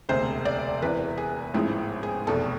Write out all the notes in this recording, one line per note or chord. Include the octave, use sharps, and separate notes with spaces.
E1 D2 C3 C5
D5
E1 E2 C3 E3 B4
G#4
A1 G#2 F3 G#3 E4
G#4
F1 E2 B2 A4